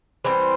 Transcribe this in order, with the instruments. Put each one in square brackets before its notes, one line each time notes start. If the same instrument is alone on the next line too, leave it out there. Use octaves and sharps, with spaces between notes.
[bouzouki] E3 G3 C4 C5